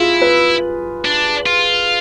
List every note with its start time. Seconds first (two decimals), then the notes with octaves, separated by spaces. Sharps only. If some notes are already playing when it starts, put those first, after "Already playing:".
Already playing: E4 F4 G#4
0.21 B4
1.05 D4
1.46 F4